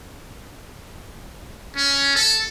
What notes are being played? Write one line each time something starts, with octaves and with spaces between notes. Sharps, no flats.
C#4
A4